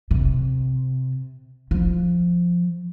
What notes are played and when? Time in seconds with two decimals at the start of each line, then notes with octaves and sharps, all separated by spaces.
0.11 C3
1.71 F3